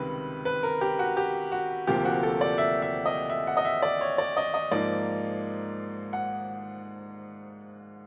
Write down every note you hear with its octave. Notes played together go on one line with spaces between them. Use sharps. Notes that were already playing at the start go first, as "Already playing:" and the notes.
Already playing: C#2 C3 D#3 G3 B4
B4
A#4
G4
F#4
G4
F#4
D2 C3 F3 A#3 G4
F#4
A4
D5
E5
E5
D#5
E5
F#5
D#5
E5
D5
C#5
D5
D#5
D#5
G#2 F3 A#3 D#4 D5
F#5